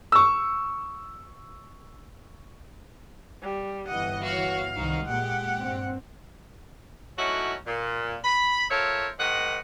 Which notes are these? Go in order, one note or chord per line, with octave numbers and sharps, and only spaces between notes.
C#6 E6
G3
G1 E3 D#5 F#5
F#4 C#5 F5
C2 D#3 D#4 F#4
A#2 G#3 G4 F#5
G2 C4
F#3 A3 C#4 D#4 E4 F#4
A#2
B5
F4 A4 A#4 C5 C#5 E5
G#2 D#3 A#4 D#5 F#5